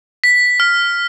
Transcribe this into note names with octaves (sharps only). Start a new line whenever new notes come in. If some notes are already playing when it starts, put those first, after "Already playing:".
B6
F6